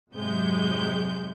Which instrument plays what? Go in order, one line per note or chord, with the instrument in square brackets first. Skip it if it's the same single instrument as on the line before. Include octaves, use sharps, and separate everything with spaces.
[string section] F2 G#2 C3 F#3 G#3 G6